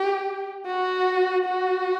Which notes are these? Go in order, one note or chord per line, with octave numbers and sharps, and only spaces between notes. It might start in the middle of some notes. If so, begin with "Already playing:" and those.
Already playing: G4
F#4
F#4